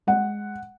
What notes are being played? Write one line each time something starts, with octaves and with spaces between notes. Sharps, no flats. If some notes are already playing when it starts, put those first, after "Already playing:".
G#3 F#5